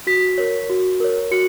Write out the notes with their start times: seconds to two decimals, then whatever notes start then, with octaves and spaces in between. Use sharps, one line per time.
0.07 F#4 B6
0.38 A#4 C#5
0.70 F#4
1.00 A#4 C#5
1.31 F#4 C#7